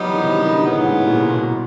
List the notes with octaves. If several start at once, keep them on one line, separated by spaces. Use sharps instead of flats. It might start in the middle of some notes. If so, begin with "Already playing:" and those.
Already playing: F#3 G3 B3 D#4
E3
D#3
C3
D3
D#3
D3
A2 C#3 F#3 B3
G#2
A2
A#2
B2
B2